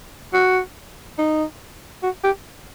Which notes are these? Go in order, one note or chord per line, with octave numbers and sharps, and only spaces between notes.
F#4
D#4
F#4
G4